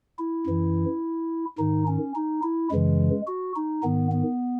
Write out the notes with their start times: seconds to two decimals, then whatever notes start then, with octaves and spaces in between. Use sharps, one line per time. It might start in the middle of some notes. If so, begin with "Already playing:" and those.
0.18 E4
0.46 F#2 E3
1.58 G#2 D#3 D#4
1.87 C#4
2.15 D#4
2.43 E4
2.71 F#2 C#3 E3 G#3
3.27 F#4
3.56 D#4
3.83 G#2 D#3 B3
4.12 B3